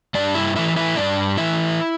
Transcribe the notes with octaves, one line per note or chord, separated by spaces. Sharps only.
G2 D4 D5
E4 E5
E3 A3 E4 E5
E4 E5
G2 D4 D5
E3 A3 E4 E5